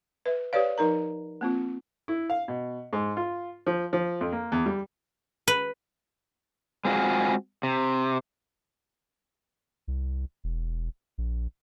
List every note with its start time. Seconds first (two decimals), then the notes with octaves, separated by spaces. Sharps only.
0.26 B4 E5
0.53 G4 B4 C#5 D5 F5
0.78 F3 D#4 A#4 A#5
1.41 A#3 C4 F4
2.08 E4
2.30 F5
2.48 B2
2.93 G#2
3.17 F4
3.67 F3
3.93 F3
4.21 F2
4.32 A#3
4.52 E2
4.66 G3
5.48 B4
6.85 G#3 C4 F4 F#4 G#4
7.63 C3
9.88 C2
10.44 E1
11.18 A#1